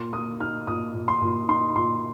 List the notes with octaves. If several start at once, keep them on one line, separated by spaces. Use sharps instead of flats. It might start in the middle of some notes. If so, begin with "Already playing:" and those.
Already playing: A#2 C6
A#3 D#6
D#4 F6
A#2 D#6
A#2
C6
A#2
D#4 C6
A#2 C6